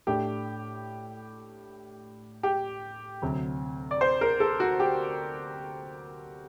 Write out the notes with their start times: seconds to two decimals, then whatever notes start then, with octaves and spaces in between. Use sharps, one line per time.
0.07 A2 A3 D4 G4
2.43 G4
3.22 D2 C3 F#3
3.91 D5
4.01 C5
4.21 A#4
4.40 A4
4.60 F#4
4.80 G4